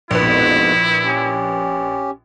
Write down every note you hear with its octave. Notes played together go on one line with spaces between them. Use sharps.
A#1 F2 G#2 B2 E4 B4
C#4 G4